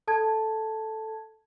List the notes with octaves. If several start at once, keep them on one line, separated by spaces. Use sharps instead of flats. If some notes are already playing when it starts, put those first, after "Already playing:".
A4 A5 G#6